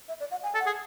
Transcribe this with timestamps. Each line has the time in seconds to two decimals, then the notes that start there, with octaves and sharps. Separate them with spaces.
0.08 E5
0.20 D5
0.31 F#5
0.43 G#5
0.55 A4
0.60 F#5
0.66 G#4